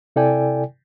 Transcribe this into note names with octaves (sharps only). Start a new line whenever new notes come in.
C3 E4 A4 D5 G5 G#5